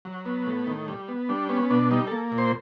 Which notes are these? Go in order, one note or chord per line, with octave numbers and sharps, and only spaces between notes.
F#3
B3
A2
D#3
G3
B3
G3 D4
B3 C#4
C#4
B2 D4
G3 D#4
A#3 A4
A#2
C5